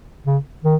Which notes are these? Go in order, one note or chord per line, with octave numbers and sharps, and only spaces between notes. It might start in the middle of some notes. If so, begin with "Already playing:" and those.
C#3
D#3